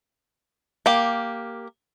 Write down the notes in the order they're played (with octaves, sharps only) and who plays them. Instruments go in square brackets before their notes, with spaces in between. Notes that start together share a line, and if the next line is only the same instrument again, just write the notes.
[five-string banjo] A#3 G4